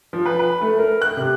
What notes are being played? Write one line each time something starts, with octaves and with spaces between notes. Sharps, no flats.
F3
B4
B4
A3
A#4
F#6
C3